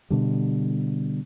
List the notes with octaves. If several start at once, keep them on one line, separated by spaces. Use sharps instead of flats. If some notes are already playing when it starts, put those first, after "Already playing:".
B2 D3 G3